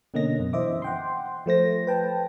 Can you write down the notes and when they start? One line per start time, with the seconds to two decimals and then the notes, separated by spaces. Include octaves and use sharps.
0.14 B2 D3 A#3 C#4 D#5 A#6
0.39 F#2 B2
0.53 E3 C5 D#5 E5 D6
0.82 F#5 G5 C6
1.46 F3 A3 C5 A#6
1.87 B4 G5 A5